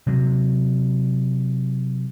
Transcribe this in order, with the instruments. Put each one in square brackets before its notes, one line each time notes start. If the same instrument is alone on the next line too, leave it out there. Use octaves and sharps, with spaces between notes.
[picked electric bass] C3 F#3